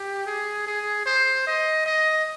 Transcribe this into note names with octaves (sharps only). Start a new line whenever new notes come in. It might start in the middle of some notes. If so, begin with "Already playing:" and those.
Already playing: G4
G#4
G#4
C5
D#5
D#5